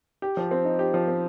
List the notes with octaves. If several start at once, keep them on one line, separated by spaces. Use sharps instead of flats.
G4
F3
C4
D#4
G4
F3
C4